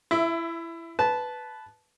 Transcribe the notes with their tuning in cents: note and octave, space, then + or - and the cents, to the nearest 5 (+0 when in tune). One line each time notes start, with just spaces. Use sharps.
E4 +20 E5 +0
B4 +5 A5 -15